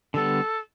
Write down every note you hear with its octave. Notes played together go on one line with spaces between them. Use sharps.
D3 G3 B3 A4